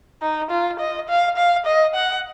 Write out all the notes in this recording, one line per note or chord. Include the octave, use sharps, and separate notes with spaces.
D#4
F4
D#5
F5
F5
D#5
F#5